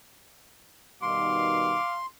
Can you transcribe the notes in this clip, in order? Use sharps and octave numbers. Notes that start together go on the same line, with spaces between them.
B2 D#3 G3 F5 C6 D6